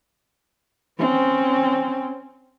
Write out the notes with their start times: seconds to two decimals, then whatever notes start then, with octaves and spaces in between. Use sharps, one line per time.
0.99 C4 C#4